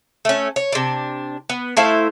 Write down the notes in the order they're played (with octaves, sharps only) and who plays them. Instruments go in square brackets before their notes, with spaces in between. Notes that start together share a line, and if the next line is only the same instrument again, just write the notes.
[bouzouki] A3 C#4
C#5
C3 D4
B3
A3 E4 C5 F5